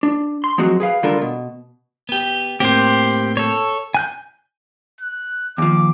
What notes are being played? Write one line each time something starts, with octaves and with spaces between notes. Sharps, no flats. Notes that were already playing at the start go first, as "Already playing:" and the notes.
D4
C6
F3 F#3 G#3 C4 F#4
G#4 B4 F5
D3 G3 D4 F4 A4 A#4
B2
B3 G4
A2 A#3 C4 G4 C5
A4 C#5
G#5 F#6 G6
F#6
D#2 F3 D6